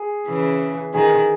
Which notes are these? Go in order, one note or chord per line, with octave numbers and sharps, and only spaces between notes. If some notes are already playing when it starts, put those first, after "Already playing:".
Already playing: G#4
C#3 E3
D#3 G#4